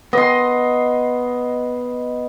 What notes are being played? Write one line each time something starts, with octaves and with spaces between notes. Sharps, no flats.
B3 D#5 C6